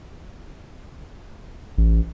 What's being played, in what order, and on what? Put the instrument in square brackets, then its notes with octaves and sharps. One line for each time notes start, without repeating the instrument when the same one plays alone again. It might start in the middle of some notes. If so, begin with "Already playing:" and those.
[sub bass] A1